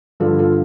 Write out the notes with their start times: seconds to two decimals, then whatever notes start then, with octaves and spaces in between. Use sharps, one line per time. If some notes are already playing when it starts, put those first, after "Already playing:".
0.20 G2 D3 F3 F4 A4
0.39 F4 A4